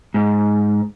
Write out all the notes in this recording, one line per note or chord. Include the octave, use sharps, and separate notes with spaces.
G#2